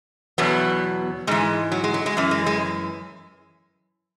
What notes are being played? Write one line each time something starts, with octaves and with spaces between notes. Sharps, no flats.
E2 B2 F#3 B3
G#2 E3 G#3
F#3
G#3
F#3
G#3
F#2 E3
G#3
G#3